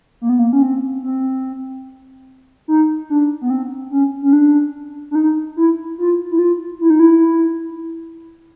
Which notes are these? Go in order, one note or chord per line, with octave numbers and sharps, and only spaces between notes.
A#3
B3
A#3
C#4
C4
C4
D#4
D4
B3
C4
C#4
C#4
D4
D4
D#4
E4
F4
E4
F4
E4
D#4
E4